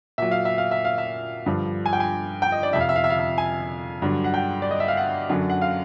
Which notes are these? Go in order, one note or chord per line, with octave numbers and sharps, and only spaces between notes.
A#2 F#3 E5
F5
E5
F5
E5
F5
E5
G2 D3 F3
G#5
G5
G#5
G5
D#5
D5
F2 C3 F3 E5
F5
E5
F5
E5
F5
E5
G#5
G2 D3 F#3
F#5
G5
D5
D#5
E5
F5
F#5
F#2 D3 F#3
F#5
F5